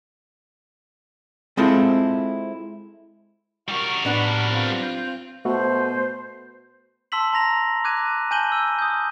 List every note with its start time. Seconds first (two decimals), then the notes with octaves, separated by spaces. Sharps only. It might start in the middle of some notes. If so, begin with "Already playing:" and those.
1.57 G#3 C4 E4 F4 A4
3.69 G3 F#4 A#4 C#6
4.05 A2 B3 D4 B4
4.49 C4 F4
4.83 G6
5.45 B2 A3 F#4 A4 C5
7.12 A5 C6 E6 B6 F#7
7.33 A5 A#5 A#6 F7
7.84 D6 F#6 G#6 D#7
8.31 G#5 A5 G6 D#7 F#7 G7
8.52 E6
8.79 D#6 G6